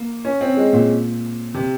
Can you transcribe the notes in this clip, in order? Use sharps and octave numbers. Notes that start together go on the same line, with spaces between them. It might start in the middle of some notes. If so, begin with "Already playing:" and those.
Already playing: A#3
C#4
C4
G#3
A#2
C3